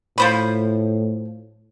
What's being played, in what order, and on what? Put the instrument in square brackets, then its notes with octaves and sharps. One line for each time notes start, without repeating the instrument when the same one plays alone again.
[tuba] A2 [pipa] F3 C5 B5